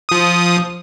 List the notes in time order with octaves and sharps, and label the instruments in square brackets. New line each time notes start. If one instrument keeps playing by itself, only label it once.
[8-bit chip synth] F3 D#6